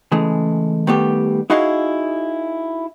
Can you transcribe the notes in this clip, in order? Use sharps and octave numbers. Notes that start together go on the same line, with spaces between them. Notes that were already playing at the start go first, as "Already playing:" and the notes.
C#3 E3 G#3 A3
D#3 G3 A3 B3 G4
D#4 E4 F#4 G#4 D#5 F5